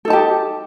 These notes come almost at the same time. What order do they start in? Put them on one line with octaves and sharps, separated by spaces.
A4 D#4 A5 G4